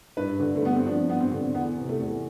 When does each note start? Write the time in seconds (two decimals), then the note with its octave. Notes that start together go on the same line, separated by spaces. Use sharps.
0.17 G2 B4
0.40 D3
0.55 A3
0.62 G2 B3
0.76 C4
0.86 F3 D4
1.09 G2 B3
1.20 C4
1.32 D3
1.54 E2 B3
1.77 C3
1.89 A3
2.00 E2